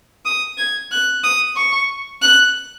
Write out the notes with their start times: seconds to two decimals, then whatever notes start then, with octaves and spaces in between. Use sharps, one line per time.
0.25 D#6
0.58 G#6
0.91 F#6
1.24 D#6
1.57 C#6
2.22 F#6